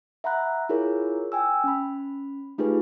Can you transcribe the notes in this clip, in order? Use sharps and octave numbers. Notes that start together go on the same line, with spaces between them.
E5 F#5 A#5 B5 F#6
E4 F4 G#4 A#4 C#5
G5 G#5 E6
C#4 B5
A3 D#4 F4 G4 G#4 B4